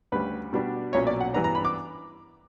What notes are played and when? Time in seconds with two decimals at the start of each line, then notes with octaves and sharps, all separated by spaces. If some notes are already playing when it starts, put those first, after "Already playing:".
0.12 D2 C#3 G3 B4
0.53 B2 G3 B3 D4
0.93 B1 A#2 F#3 C#4 C#5
1.07 D5
1.20 F#5
1.34 G2 E3 B3 D4 A#5
1.44 A#5
1.55 B5
1.65 D6